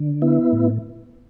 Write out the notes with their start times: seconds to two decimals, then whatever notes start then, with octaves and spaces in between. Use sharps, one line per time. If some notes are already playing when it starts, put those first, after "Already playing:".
Already playing: D3
0.22 B3 E4
0.52 A2